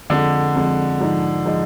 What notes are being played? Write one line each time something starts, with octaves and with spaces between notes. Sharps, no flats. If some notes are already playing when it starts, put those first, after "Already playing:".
F2 D3 F3 G#3
F2 F3 G#3
G#2 F3 G#3 D#4
F3 G#3 D#4